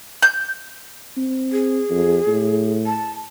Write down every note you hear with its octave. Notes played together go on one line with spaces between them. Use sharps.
G6
C4
G#4
F2
A2
A5